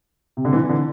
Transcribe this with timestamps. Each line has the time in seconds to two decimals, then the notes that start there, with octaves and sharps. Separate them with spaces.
0.37 C3
0.45 D3
0.53 E3
0.69 D3